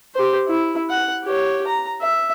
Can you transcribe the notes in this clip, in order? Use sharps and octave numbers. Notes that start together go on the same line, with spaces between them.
G4 C5
E4
F#5
G4 C#5
A#5
E5